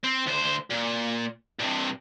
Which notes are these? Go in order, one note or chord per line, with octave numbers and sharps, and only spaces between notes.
C4
D2 C5
A#2
G2 C3